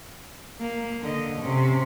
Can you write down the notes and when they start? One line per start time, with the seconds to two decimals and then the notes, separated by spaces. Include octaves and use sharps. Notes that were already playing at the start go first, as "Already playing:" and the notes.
0.60 A#3
1.02 D3 D#5
1.39 C3 C#4